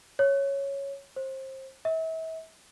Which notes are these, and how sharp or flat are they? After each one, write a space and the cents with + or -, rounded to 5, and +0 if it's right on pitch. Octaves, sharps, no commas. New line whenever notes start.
C#5 -5
C5 +25
E5 -35